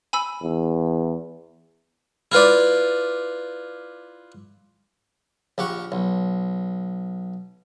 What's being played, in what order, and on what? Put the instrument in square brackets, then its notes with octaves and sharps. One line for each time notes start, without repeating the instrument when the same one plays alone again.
[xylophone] G#5 B5 E6
[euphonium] E2
[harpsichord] E4 F4 B4 D5
A#1 G4 F#5 C#6
B1